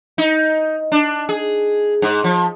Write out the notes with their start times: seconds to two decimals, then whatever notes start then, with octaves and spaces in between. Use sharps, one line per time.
0.18 D#4
0.92 D4
1.29 G#4
2.02 G#2
2.24 F3